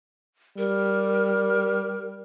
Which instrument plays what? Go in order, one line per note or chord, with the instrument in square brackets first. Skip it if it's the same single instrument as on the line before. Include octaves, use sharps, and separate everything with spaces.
[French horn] G3 [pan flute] A#4